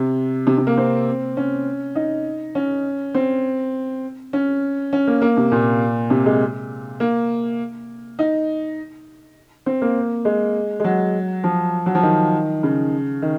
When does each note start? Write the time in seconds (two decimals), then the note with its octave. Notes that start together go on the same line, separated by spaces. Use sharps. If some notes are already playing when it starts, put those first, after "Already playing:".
Already playing: C3
0.47 C3
0.58 C3
0.67 A#3
0.77 C4
1.37 C#4
1.95 D#4
2.55 C#4
3.15 C4
4.33 C#4
4.93 C#4
5.07 A#3
5.22 A#3
5.37 C3
5.52 A#2
6.10 C3
6.26 G#3
7.00 A#3
8.19 D#4
9.66 C4
9.82 A#3
10.25 G#3
10.80 G#3
10.84 F#3
11.44 F3
11.86 F#3
11.95 F3
12.03 D#3
12.63 C#3
13.22 D#3